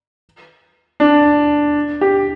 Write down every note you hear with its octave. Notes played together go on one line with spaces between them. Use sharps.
D4
G4